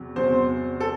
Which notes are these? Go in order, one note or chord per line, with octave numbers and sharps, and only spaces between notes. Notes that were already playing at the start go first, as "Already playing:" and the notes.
Already playing: E2 C3 F#3
E2 C3 F#3 C5
A4